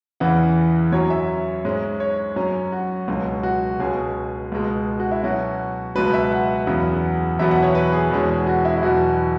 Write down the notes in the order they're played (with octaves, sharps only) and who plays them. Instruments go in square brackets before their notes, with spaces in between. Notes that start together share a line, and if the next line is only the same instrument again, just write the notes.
[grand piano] E2 C#3 E3 F#5
F#2 F#3 C#4 C#5
E5
G#2 G#3 C#4
C#5
F#2 F#3 C#4
F#4
C#2 B2 F#3 C#4
F#4
C#2 B2 G#3 C#4 G#4
C#2 B2 G#3
F#4
E4
B2 F#3 C#4 F#4
C#2 B2 F#3 B4
E5
F#5
E2 C#3 F#3 B3
E2 B2 F#3 B3 E5
F#5
C#5
B4
G#4
E2 B2 G#3 C#4
F#4
E4
E4
E2 B2 F#3 F#4